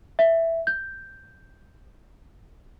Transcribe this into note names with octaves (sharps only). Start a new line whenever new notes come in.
E5
G6